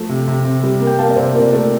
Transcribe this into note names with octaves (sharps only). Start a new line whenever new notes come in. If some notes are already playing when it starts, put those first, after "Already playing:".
Already playing: F3 A3
C3
C3
C3
G3
A#3
G5
A#3 F5 A5
D5
C3 C5 E5
A#2 A#4 D5
A3 A#4 D5